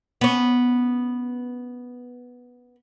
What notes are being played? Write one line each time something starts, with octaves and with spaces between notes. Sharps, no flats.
B3 C#4